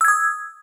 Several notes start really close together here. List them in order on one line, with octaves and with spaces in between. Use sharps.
E6 G#6 D#6